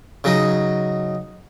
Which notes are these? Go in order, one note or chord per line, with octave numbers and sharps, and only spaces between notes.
C#3 F#3 D#4